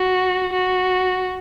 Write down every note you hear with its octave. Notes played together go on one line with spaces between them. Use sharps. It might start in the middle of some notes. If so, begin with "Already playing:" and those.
Already playing: F#4
F#4